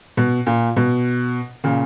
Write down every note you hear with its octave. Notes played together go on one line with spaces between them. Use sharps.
B2
A#2
B2
A#2 C#3